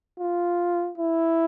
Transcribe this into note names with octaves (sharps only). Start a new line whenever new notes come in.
F4
E4